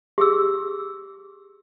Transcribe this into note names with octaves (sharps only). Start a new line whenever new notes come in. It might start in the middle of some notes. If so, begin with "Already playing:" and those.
G4 G#4 E6